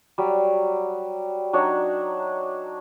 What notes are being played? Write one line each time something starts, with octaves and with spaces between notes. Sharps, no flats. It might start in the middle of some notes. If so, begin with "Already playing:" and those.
F#3 G3
F#3 D4 D#4 C#5